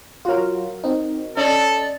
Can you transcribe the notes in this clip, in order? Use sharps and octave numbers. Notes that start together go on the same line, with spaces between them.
F#3 F4 F#4 A#4
C4 D#4
C#4 A4 D5 D#5